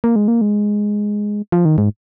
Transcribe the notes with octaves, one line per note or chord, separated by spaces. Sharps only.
A#3
G#3
A#3
G#3
F3
D#3
G#2